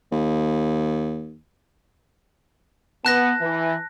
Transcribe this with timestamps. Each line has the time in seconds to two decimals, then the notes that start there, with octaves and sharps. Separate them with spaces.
0.12 D#2
3.05 B3 A5 F#6 A#6
3.41 E3